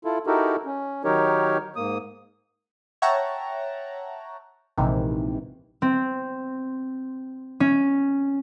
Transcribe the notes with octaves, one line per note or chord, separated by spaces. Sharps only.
E4 F4 A4
D#4 E4 F#4 G4 A4 A#4
C#4
D#3 F#3 D#4 G4 A#4 C#5
G#2 A#3 D#6
C#5 E5 F#5 G5 A5 A#5
A#1 G#2 C3 D#3 E3
C4
C#4